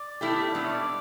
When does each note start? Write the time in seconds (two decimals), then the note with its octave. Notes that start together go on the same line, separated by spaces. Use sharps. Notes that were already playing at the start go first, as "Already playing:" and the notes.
Already playing: D5
0.21 B2 A3 E4 G4
0.55 B2 G3 B3 D4 E5
0.65 C#5
0.71 D5